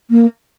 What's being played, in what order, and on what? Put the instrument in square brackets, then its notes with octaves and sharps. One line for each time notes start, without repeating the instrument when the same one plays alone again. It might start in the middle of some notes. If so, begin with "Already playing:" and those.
[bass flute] A#3